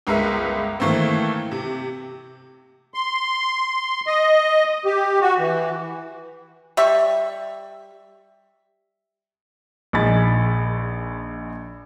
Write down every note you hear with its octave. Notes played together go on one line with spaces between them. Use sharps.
G1 C#2 G#3 A#4 B4 E5
D#3 E3 A3 A#3 C4
C3
C6
D#5
G4
F#4
E3
G3 E5 C#6
A#1 D#4 G#4 B5 G#6 A6